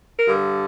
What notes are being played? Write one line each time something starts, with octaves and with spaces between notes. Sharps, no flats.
A#4
G2 D3